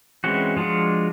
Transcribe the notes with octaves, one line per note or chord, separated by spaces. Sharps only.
E3 G#3 C4 C#4 F#4
F3 G#3 D4 F4 F#4